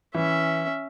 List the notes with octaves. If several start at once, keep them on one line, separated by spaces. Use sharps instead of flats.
E3 C#4 E5